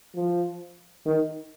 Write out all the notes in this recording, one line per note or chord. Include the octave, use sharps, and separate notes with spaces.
F3
D#3